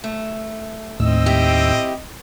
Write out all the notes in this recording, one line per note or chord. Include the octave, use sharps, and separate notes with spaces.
A3
D#2 A2 C4 D#5 E6
E4 G4